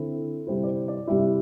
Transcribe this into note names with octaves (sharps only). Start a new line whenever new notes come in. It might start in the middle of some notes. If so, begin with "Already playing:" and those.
Already playing: D3 C4 E4 A4
C3 G3 E4 C5
D5
C5
D5
C3 G3 E4 E5